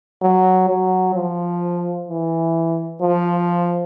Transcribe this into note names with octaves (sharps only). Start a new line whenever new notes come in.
F#3
F#3
F3
E3
F3